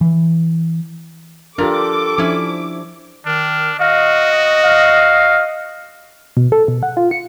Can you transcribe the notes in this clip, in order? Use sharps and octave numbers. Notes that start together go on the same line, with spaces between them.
E3
F3 D4 F4 G4 A4 A#4 D5 D6
F3 C#4 D4 E4
D#3 D4 F6
F#4 D#5 F5
F5
B2
A4
B2
F#5
F4
C#7